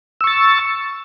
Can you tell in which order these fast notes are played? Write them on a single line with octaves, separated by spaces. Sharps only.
E6 C#6 A6